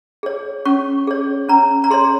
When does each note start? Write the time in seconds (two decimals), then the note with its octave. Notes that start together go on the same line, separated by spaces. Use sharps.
0.23 G#4 C#5
0.66 C#4 C#6
1.07 G#4 C#5
1.49 C#4 A#5
1.84 A#5
1.91 G#4 C#5 C6